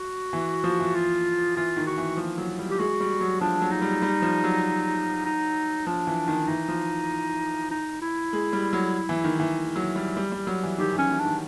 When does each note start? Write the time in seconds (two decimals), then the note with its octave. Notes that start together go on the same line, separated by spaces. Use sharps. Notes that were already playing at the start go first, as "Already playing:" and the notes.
Already playing: F#4
0.33 E3
0.64 F3
0.80 E3
0.95 F4
1.56 E3 F4
1.76 D#3
1.87 F#4
1.97 E3
2.17 F3
2.38 F#3
2.59 G3
2.71 G4
2.79 G#3 F#4
3.00 G3
3.21 F#3
3.41 F3 D4
3.62 F#3
3.71 D#4
3.82 G3
4.02 G3
4.22 F3
4.44 F#3
5.25 D#4
5.87 F3 D4
6.07 E3
6.28 D#3
6.48 E3 D#4
6.69 F3
7.71 D#4
8.02 E4
8.33 G#3
8.53 G3
8.73 F#3
9.09 E3
9.24 D#3
9.40 E3
9.76 F#3
9.96 G3
10.17 G3
10.32 G3
10.47 F#3
10.63 E3
10.78 D#3 G4
10.93 E3
10.98 C#4
11.10 E3
11.19 D4
11.25 D#3